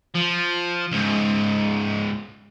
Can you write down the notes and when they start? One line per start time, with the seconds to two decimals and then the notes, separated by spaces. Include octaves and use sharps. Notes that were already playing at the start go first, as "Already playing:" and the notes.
0.15 F3
0.92 C#2 G#2